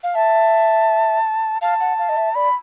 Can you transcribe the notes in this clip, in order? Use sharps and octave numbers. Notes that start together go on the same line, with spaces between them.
F5
E5 A5
F5 A5
F#5
F5
D#5
E5
D5 B5